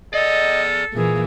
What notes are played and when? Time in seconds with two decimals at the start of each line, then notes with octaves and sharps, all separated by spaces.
0.14 G#4 A4 D5 D#5
0.93 A#2 E3 A#3 G#4